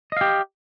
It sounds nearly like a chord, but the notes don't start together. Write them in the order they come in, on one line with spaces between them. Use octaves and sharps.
D#5 F5 G4